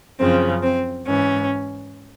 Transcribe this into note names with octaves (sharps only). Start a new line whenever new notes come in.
F#2 C#3 F3 C4
C4
G#2 E3 C#4